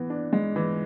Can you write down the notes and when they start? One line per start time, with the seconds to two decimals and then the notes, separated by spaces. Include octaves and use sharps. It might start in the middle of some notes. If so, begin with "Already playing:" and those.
Already playing: E3 B3
0.10 D4
0.33 G#3
0.56 E3